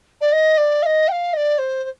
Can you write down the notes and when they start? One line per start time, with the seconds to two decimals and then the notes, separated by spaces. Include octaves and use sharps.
0.21 D5
0.32 D#5
0.57 D5
0.82 F5
0.86 D#5
1.08 G5
1.12 F5
1.33 D#5
1.37 D5
1.58 C5
1.84 C5